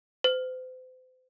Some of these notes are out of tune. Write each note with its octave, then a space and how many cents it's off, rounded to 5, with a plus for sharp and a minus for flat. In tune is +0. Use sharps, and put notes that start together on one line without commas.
C5 -40